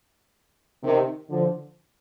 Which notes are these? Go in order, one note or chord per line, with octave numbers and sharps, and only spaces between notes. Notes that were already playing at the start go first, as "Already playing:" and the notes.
C3 D#3
D3 F3